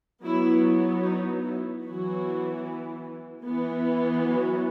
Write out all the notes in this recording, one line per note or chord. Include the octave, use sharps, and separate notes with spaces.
F#3 B3 E4
D#4
E4
E3 F#3 B3 F#4
E3 B3
F#3 F#4